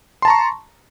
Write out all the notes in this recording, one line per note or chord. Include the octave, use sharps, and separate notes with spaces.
A5 A#5 C6 C#6